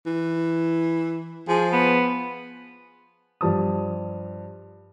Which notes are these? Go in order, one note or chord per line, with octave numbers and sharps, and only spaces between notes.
E3
F3 G#4
B3
G2 F3 A5 D#6